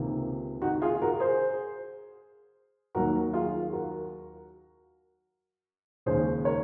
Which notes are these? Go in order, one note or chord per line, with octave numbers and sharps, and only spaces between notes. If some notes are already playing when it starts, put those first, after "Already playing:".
Already playing: C#2 C3 D#3 A#3
D#4 F#4
F4 G#4
F#4 A#4
G#4 C5
D#2 D#3 F#3 A#3 F#4 A#4
F4 G#4
F#4 A#4
D#2 C#3 G#3 C#4 G#4 C5
A#4 C#5